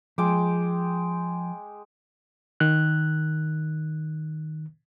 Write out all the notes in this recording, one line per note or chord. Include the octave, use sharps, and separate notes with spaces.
F3 G#3 G5 D6
D#3 F#6